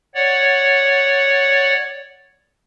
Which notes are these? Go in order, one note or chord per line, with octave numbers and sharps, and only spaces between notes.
C#5 D5 F#5